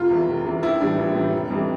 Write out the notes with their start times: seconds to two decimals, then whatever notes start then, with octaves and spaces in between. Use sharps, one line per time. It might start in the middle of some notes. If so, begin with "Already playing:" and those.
Already playing: F1 F4
0.11 E2 E3
0.28 F1
0.45 E2 E3
0.63 A#1 E4
0.80 A2 E3 G3 D4
0.98 A#1
1.15 A2 E3 G3
1.33 F1
1.50 F2 E3 G3